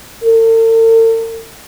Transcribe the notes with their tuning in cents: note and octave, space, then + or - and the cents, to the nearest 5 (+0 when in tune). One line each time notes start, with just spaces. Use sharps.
A4 +45